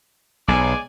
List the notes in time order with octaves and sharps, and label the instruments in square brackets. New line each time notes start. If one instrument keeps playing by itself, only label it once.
[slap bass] B1 [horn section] G#3 D5 G#5